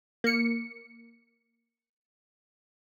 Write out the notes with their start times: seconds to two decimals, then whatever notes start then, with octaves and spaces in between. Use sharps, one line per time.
0.24 A#3 C#7